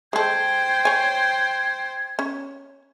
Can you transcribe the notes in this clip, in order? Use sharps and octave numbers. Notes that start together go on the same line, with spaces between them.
G#3 A4 C5 G5 G#6
C#5 G#5
C#4